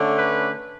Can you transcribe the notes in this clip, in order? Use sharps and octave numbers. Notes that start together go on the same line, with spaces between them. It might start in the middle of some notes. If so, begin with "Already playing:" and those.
Already playing: D3 A3 C#4
B4